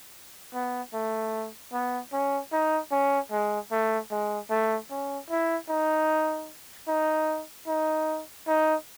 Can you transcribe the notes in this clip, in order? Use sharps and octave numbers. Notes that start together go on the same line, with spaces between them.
B3
A3
B3
C#4
D#4
C#4
G#3
A3
G#3
A3
C#4
E4
D#4
D#4
D#4
D#4